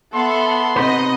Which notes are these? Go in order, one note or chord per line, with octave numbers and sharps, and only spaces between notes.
B3 A4 E5 F#5 C6
C3 D#4 B4 D#5 F#5